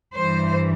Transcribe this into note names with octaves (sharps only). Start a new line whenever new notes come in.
G2 E3 C5